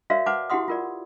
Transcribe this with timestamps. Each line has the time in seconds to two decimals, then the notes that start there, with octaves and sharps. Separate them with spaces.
0.10 F#4 A#4 C#5 D5 E5 F5
0.26 B4 C5 F#5 A5 D6
0.50 E4 F#4 G4 F#5 C6 D#6
0.68 F4 A#4 D5